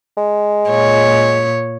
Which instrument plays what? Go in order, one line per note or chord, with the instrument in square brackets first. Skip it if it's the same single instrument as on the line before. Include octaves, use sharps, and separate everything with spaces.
[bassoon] G#3
[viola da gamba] A#2 C#5